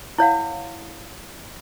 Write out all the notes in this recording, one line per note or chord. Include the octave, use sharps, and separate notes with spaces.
E4 C#5 F5 F#5